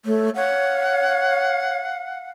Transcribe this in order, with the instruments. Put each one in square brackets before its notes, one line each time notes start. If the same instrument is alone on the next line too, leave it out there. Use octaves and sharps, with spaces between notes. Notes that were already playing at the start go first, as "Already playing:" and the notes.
[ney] A3 [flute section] C#5
[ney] C#5 [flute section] F5 F#5